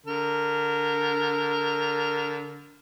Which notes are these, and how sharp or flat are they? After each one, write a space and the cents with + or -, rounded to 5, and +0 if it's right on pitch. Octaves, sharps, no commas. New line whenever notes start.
D3 -25 A#4 -10